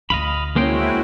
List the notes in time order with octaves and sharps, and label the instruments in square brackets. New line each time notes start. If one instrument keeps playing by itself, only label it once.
[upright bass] D2 [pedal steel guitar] D#5 F5 B5
[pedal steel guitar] G#3 C5 G5 [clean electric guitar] A#3 C#4 [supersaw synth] E4 F#4